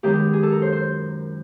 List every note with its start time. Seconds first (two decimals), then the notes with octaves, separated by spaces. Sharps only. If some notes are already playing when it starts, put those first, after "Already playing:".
0.03 F#2 D#3 G#3 B3 G4
0.33 G#4
0.43 A4
0.52 A#4
0.62 C5
0.72 C5